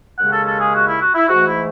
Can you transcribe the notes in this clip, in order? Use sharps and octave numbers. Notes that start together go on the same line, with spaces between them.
D#2 C#3 G#3 C#4 F#5
A4
A4
G#4
F#4
E4
F#4
E4
G#2 E3 A3 F#4
E4